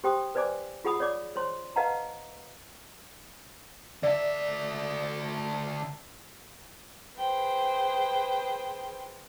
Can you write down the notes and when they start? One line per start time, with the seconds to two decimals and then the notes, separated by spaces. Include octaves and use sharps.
0.04 G4 C5 G5 C6 D#6
0.35 B4 C5 D5 G#5 D6
0.84 F4 G#4 F#5 B5 D#6
1.00 C#5 D5 D6
1.36 C5 C#5 C6
1.76 B4 D#5 F5 F#5 A5 A#5
4.03 D3 D5 E5
7.19 G#4 B4 C5 G5